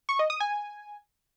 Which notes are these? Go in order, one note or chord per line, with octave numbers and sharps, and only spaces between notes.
C#6
D#5
D#6
G#5